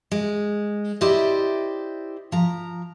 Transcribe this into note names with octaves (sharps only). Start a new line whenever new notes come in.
G#3
E4 G4 C5 D5 D#5
F3 A#5